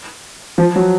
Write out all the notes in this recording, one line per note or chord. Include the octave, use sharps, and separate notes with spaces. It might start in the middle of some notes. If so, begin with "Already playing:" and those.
F3
F#3